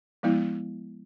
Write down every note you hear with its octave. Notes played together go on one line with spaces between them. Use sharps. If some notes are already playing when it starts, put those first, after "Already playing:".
F3 G#3 B3 E4